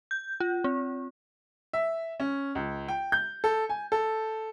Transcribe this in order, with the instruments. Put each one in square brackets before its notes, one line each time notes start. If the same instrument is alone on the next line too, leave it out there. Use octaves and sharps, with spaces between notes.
[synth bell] G6
F4
C4
[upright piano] E5
C#4
C#2
G5
G6
A4
G#5
A4